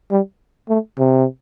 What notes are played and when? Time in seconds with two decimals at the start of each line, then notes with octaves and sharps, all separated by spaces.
0.11 G3
0.69 A3
0.99 C3